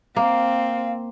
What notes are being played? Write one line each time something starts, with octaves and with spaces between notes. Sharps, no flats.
A#3 C4 F5